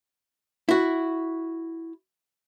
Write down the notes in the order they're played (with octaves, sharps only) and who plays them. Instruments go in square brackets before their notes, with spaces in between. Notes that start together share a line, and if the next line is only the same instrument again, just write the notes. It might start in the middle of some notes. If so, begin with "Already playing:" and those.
[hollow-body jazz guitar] E4 F#4